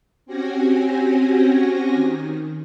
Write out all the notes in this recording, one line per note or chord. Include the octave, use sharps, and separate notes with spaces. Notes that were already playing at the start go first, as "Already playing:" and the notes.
C4 C#4 F#4 G4 G#5 A#6
D#3